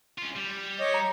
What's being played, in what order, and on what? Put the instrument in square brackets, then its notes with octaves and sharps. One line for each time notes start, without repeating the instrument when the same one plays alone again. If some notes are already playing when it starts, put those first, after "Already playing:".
[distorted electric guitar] C#4 F4
G3
[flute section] C#5 D#5 D6
[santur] A#5